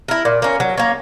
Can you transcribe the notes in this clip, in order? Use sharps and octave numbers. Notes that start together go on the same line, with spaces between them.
E4 A#4
A#2
A#3 C#4
F#3
A#3 C#4